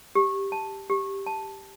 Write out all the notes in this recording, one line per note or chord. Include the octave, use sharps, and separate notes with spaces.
G4
A5
G4
A5